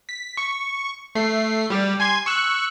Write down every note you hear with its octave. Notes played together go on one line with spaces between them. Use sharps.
B6
C#6
A3 C7
G3 G4
G#5 C6 G#6
C#6 E6 F#6